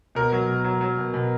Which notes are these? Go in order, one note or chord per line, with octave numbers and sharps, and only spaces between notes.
B2 A#4
F#3
B2
F#3
F#3
B2
B2